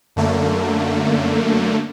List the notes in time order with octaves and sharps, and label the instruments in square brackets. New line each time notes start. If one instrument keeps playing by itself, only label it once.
[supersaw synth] F#2 D3 A3 A#3